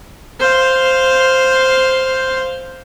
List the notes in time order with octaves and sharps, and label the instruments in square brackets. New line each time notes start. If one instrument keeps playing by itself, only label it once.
[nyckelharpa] C5 F5